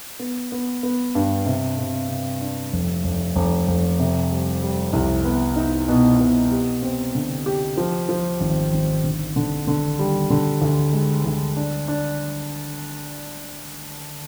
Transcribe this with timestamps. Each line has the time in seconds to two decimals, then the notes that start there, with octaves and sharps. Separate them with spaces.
0.19 B3
0.52 B3
0.83 B3
1.15 G2
1.46 C3
1.78 C3
2.09 C3
2.41 D4
2.73 F1
3.04 F1
3.35 F1
3.67 F1
3.99 C3
4.31 G3
4.63 G3
4.93 C2
5.25 B3
5.56 D#4
5.88 B2
6.20 B2
6.51 G4
6.82 C4
7.15 D3
7.46 G4
7.77 F3
8.09 F3
8.40 G#1
8.73 G#1
9.04 D3
9.36 D3
9.68 D3
9.99 G3
10.30 D3
10.62 D2
10.93 G#3
11.25 D2
11.57 D4
11.88 D4